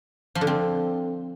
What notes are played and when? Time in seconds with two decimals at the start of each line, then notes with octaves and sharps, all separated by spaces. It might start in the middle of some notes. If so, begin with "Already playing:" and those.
0.35 F3
0.41 D3
0.47 C4